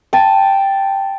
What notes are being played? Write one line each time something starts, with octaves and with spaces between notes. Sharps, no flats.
G5 A5